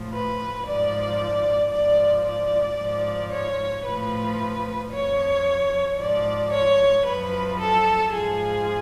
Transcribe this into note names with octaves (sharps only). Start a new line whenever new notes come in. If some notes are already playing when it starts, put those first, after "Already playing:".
Already playing: A2 F3
B4
G#2 F3 D5
G#2 F3 D5
D5
G#2 F3
C#5
A2 F3 B4
F2 F3 C#5
G#2 F3 D5
C#5
F#2 F3 B4
A4
G#2 F3 G#4